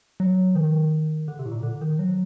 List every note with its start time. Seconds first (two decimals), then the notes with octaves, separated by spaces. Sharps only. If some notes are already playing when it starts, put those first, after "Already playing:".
0.20 F#3
0.55 D#3
1.28 D3
1.39 C3
1.46 A2
1.52 A#2
1.63 D3
1.81 D#3
1.99 F#3